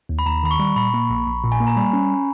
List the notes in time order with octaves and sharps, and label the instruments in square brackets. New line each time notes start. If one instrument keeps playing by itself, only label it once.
[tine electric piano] D#2
[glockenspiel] B5
[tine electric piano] D#2 [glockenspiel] A#5
[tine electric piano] D#3 [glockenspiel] B5
[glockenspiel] C#6
[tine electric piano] G3
[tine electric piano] A#2 [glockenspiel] B5
[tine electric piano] A#3
A#1
A#1
A#2
[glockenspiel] G#5
[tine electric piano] A#3
[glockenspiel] A#5
[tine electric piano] G3 [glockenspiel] B5
[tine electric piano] C#4